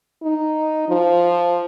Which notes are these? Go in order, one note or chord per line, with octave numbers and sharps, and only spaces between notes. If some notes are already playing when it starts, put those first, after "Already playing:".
D#4
F3